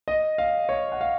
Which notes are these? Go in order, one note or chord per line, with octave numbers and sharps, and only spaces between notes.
D#5
F5
C#5
F#5
F5